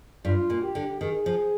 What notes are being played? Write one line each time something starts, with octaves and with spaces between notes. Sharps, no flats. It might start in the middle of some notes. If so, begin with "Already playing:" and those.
G2 F4
A#2
G4
D3
D#3 G#4
F3